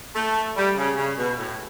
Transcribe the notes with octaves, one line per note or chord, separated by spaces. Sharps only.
A3
G3
C#3
C#3
B2
A2